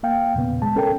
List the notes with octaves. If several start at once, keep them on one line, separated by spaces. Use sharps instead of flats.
A#3 F5 G5
E2 A#2 C#3 B3
G#3 A5
C#4 A4 A#4 G5